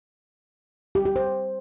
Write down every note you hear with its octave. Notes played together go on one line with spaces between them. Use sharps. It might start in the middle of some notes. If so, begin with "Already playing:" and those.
G4
G4
C5